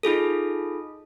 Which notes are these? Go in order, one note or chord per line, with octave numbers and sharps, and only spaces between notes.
D#4 F4 G#4 A4